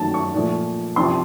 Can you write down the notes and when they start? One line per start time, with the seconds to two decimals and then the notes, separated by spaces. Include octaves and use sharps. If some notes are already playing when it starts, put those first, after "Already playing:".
Already playing: F#2 D#3 F#3 A3 A5
0.14 C#6
0.34 A#2 F3 A3
0.96 C2 C3 F3 C6